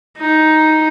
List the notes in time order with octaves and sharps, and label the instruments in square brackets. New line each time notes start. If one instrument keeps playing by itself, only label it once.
[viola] D#4